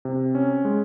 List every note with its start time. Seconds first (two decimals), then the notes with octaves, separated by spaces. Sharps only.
0.05 C3
0.35 C#4
0.65 G#3